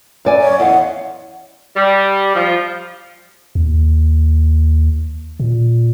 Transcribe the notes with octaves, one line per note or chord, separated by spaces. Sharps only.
F#2 D5 G#5
C#5
E2 D#5 F5 F#5
G3
F3
D#2
A#2